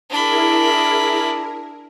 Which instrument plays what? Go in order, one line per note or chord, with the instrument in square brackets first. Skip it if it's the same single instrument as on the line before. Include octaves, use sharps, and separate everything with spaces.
[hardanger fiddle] D4 B5 [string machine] E4 G#4 A#4